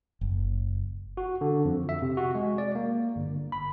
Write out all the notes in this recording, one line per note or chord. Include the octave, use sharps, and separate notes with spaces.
F#1
F#4
D3
F2
E5
C3
F#4
G#3
D5
A#3
G1
B5